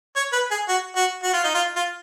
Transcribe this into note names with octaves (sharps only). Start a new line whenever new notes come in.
C#5
B4
G#4
F#4
F#4
F#4
F4
D#4
F4
F4